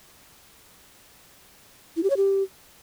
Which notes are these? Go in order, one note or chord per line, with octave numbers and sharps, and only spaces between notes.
E4
G4
C#5
G4